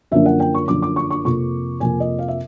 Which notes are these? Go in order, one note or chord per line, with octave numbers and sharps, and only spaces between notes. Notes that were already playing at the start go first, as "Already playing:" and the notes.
F#2 D3 F3 A#3 D4 E5
F#5
G5
C#6
F#2 D3 F3 A#3 D4 D6
D6
C#6
C#6
F2 C3 F3 A#3 C#6
F2 C3 F3 A#3 G#5
D#5
F5
E5